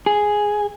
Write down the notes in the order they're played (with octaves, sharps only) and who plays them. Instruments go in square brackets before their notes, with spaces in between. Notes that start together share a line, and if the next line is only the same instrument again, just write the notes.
[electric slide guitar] G#4